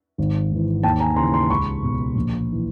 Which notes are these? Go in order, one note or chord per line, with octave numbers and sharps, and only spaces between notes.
G#1
G#2 E3
D#2 G5 A5
G#5 A#5
C#3 E3 A#5 C6
A#5 C6
C#2 B5 C#6
B2
A#1
E3